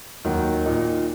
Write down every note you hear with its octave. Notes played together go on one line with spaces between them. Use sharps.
D#2 D#3 F#3
A#2 A#3 D#4